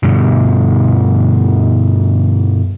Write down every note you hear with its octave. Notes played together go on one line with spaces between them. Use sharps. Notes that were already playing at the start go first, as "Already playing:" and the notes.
G2 B2 D3